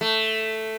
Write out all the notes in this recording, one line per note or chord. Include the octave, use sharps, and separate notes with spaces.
A3